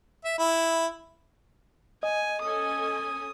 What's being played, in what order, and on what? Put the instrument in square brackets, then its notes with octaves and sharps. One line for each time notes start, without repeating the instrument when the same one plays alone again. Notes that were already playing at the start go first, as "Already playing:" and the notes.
[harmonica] E5
E4
[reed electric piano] D#5 [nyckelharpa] G#5
[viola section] C#4 A4 G#5 [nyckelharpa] D#6